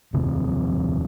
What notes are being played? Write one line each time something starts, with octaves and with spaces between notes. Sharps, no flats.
F1 D#2 C3